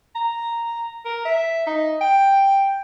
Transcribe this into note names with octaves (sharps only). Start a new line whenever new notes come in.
A#5
A#4
E5
D#4
G5